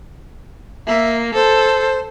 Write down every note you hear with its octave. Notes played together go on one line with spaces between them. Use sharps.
A#3 E5
A4 C5